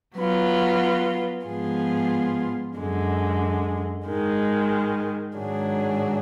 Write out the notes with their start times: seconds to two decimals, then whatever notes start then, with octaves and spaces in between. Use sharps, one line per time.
0.16 F#3 B3 F4
1.46 G#2 F3 B3 F4 G#4
2.77 F#2 D3 G#3
4.06 G#2 D#3 G#3
5.37 G#2 D#3 F#3 D4 G#4